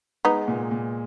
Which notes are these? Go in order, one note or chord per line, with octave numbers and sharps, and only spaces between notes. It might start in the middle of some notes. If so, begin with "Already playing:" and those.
G#3 B3 D#4
A#2
A#2